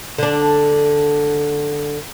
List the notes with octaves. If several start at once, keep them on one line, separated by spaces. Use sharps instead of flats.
D3 D4